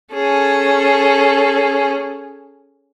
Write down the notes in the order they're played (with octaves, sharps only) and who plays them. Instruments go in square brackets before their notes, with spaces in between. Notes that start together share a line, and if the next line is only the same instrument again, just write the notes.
[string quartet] C#4 G#4 A4